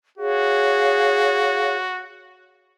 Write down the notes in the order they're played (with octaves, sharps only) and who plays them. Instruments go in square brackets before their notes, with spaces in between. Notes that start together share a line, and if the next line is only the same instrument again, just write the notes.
[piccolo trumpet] F#4 [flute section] G#4 C#5 F5